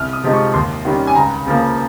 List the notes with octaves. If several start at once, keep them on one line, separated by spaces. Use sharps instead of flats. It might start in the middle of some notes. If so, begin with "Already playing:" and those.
Already playing: C2 F6
D#6
C3 F3 G#3 D#4
C#6
D#2 C6
D#3 G3 C#4
G#5
C#2 A#5
C#3 F3 A#3